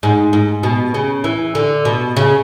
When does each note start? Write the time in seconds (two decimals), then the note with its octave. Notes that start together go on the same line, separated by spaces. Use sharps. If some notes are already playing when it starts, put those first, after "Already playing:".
0.03 G#2
0.33 G#2
0.63 B2
0.94 C#3
1.24 E3
1.55 D3
1.85 B2
2.17 C#3